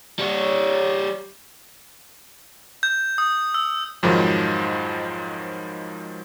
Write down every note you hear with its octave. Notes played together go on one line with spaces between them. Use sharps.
G3 C#5
G6
D#6
E6
F2 G#2 D#3 F3 F#3 G#3